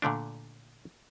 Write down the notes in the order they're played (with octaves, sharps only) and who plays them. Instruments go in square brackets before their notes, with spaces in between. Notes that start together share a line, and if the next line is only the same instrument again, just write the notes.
[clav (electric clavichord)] A#2 D3 A3 D4